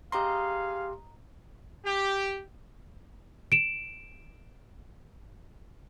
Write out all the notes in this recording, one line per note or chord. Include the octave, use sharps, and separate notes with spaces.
G4 G#4 D#5 F5 A#5 C6
G4
D7 E7